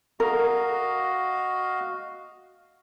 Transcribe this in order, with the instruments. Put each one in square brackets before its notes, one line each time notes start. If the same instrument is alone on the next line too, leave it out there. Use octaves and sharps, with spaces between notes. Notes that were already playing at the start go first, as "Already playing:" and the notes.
[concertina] F#4 D#5 F5 [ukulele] A#4